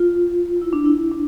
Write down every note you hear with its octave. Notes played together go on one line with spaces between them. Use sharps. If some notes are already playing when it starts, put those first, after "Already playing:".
Already playing: F4
E4
D4
E4
D4